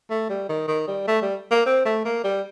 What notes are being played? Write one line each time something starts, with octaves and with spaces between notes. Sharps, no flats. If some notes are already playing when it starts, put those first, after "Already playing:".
A3
G3
D#3
D#3
G3
A3
G3
A#3
C4
A3
A#3
G3